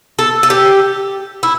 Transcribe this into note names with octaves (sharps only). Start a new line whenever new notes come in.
A4
A4
G4
E4